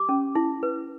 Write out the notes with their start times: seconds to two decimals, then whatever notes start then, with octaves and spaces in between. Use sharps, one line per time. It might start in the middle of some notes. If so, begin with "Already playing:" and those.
Already playing: G4 D6
0.09 C#4
0.35 E4
0.63 B4